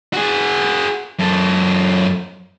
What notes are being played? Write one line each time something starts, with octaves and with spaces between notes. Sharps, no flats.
F#4 G#4
F#2 A4